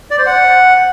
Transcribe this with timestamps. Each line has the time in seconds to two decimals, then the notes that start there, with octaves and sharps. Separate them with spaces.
0.11 D5
0.18 C5
0.26 F#5